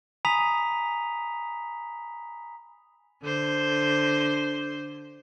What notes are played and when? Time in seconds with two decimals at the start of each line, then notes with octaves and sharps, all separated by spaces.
0.25 G#5 A#5 B5 D#6 B6 F7
3.23 D3 C5